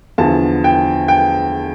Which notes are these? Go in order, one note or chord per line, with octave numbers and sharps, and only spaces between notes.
E2 D3 F3 A5
G5
G5